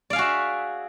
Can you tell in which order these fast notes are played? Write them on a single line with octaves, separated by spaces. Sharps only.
D5 F5 G#4 F#4 E5